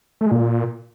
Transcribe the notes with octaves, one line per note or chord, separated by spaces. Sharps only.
A3
G#3
A#2